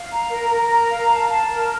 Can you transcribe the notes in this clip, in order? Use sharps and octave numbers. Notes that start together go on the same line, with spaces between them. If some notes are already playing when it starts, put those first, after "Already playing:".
Already playing: F5
A#5
A#4
A#4
A#5
F5
A5
A5
A#4